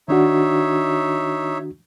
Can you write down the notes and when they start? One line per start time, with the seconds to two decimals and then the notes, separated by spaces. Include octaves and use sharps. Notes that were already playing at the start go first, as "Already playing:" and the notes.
0.08 D#3 D4 D#4 F#4 C#5 E5